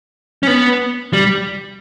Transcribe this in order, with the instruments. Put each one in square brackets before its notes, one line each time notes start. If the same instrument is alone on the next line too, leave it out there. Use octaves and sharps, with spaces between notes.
[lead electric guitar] C#4
B3
G3